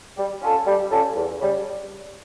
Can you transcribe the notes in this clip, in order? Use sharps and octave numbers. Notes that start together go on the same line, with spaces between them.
G3
C#4 F4 A4
G3
C#4 F4 A4
E2
C#3 G3